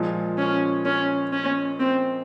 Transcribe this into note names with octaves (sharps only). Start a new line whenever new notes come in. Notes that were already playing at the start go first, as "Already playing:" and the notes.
Already playing: A#2 F3 G#3
C#4
C#4
C#4
C4